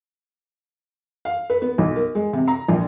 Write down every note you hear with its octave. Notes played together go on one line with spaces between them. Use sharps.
F5
B4
B3
B1
A#4
G#3
C3
A#5
A#1